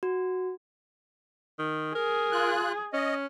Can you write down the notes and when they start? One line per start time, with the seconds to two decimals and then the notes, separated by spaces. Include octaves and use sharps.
0.03 F#4
1.59 D#3
1.95 G#4 A#4
2.32 F4 F#6
2.93 C#4 D#5